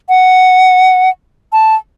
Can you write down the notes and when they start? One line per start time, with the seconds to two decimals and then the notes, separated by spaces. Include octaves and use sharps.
0.09 F#5
1.53 A5